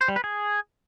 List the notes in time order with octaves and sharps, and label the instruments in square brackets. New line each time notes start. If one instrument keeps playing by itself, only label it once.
[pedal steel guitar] C5
G3
B4
G#4